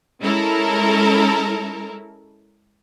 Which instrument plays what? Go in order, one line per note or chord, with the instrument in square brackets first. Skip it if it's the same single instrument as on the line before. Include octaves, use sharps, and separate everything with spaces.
[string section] G#3 C#4 E4 A4 A#4